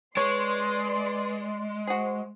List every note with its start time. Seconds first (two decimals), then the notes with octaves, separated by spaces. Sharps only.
0.17 G#3 B4 C#5 D5 C6
1.87 F#4 G#4 C5